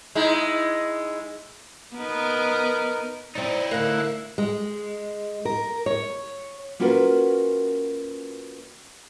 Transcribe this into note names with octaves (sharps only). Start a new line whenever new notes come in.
G#3 D#4 E4
B3 D#4 A#4
C4 D#4 E4 D5
D3 A3 A#4 F5 F#6
G#3
A#4
C#5
A#3 C#4 F4 F#4 A#4 B4